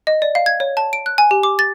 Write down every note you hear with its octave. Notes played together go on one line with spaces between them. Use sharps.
D#5
D5
F5
G#6
C#5
A5
D7
F#6
G#5
G4
D6
A6